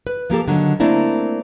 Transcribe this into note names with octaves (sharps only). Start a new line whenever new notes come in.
B4
F3 A#3 G4 A4
D3 D#3 F#3
A3 A#3 C4 D4 E4 A#4